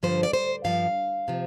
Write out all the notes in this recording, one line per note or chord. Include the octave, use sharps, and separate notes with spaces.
G2 D3 F3 C5
D5
C5
G2 F3 F5
C3 F3